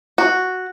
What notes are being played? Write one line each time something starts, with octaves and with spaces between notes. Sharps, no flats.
F#4